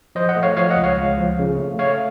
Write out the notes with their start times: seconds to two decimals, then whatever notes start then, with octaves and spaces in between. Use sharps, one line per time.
0.15 F3 C5 D#5
0.29 D#5 F#5
0.36 A3
0.43 C#5 F5
0.57 F3 C#5 F5
0.70 D#5 F#5
0.77 C#2
0.84 C#5 F5
0.97 C#2
1.17 F3
1.39 C#3
1.58 A3
1.79 A3 C#5 F5